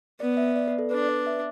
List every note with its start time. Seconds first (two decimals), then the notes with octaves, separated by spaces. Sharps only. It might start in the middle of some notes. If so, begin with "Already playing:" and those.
0.20 B3 D5
0.37 E5
0.56 D5
0.68 B4
0.79 A4
0.91 D4 B4
1.02 B4
1.09 D5
1.27 E5